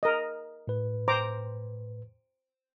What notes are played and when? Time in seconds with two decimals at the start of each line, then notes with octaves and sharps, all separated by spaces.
0.03 A#4 D#5
0.67 A2 B4
1.08 C5 A#5 D6